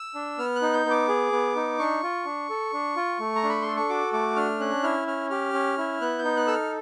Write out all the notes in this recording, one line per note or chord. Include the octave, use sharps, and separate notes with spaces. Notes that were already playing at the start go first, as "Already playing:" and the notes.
Already playing: E6
D4
B3 F6
F#6
D#4
G6
B3
D6
G#4
B3
D#4
D4 C#6
F4
D4
A4
D4
F4
A3
A#5
D4
B5
A4 C6
C#6
F#4 D6
A3 D6
D4 F6
C#4 F#6
E4 F6
C#4 F6
G4 F6
C#4
E4
B3 F#6
G6
D#4
F#6
A4 E6
F6